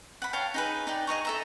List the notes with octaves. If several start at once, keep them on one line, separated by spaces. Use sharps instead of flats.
F#5 B5
C#5 F5 G5 A5
D#4 G#4 B4
D#4 D5 G5
G#4 D#5 A#5 C#6
A4 E5 A#5